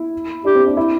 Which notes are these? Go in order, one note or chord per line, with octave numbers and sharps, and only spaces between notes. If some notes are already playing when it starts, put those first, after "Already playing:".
Already playing: E4
D4 G4
C4
D4
E4